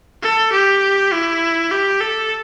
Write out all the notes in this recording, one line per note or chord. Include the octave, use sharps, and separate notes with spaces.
A4
G4
E4
G4
A4